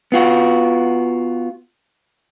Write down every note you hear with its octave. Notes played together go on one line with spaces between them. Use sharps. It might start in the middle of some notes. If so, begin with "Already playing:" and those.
B3 F4 F#4